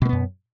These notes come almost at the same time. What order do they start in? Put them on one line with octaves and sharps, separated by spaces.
B2 A#3 B3 F#2